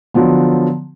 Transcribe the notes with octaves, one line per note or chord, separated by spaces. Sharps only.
D3 F3 F#3 B3